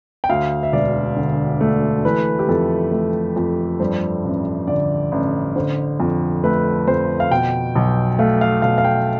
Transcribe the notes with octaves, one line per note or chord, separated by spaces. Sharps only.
G5
D2 F5
E5
E1 D5
D3
A3
E3 B4
G4
F2 A4
A3
F2
G2 C5
A1
D3 D5
A1
D3 C5
F2
A3 B4
F2 C5
F5
B2 G5
B1
A3 F5
F5
B1 F5
F5
G5